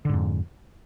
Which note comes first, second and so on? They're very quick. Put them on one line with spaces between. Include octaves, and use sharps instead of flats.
D3 G#2 F2